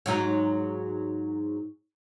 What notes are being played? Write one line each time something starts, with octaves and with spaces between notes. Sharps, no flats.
G#2 F#3 D#4